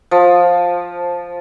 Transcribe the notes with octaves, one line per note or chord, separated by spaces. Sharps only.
F3